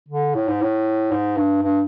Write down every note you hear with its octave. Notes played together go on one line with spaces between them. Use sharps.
D3
A2
G#2
A2
G#2
G2
G2